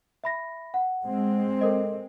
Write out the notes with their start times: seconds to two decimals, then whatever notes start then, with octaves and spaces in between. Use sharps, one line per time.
0.24 E5 B5 A#6
0.74 F#5
1.06 G#3 C4
1.61 A4 A#4 D#5